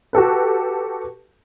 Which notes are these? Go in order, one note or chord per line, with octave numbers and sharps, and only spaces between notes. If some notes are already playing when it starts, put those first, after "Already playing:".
F#4 G4 A4 B4